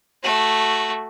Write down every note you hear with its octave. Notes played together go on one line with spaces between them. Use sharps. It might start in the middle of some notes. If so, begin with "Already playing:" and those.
A3 F#4